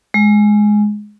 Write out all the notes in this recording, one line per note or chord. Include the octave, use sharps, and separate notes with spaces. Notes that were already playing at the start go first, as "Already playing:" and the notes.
G#3